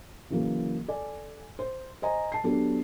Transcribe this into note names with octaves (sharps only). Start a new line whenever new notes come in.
C#3 E3 F#3 A#3
A4 D5 G#5
C5
C5 D#5 G#5 A#5
A5 C7
F#3 B3 D4 G4 A4